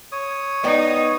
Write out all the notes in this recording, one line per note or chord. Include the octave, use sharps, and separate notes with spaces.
C#5 D#6
B3 D#4 D5 D#5 G5